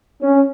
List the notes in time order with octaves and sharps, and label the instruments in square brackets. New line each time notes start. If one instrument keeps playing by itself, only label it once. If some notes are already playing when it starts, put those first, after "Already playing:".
[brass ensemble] C#4